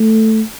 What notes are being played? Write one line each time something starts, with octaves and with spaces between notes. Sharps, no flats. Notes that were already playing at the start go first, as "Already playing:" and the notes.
Already playing: A3